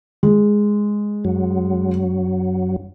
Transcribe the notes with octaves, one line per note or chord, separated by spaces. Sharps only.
G#3
F#2 F#3